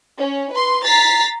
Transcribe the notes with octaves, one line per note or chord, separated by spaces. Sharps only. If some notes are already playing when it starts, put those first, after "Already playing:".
C#4
B4 C6
A#5 A6 B6 C7